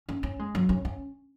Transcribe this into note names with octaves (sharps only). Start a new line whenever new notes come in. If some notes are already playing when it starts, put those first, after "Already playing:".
C#4
C#4
G#3
F#3
C#4
C#4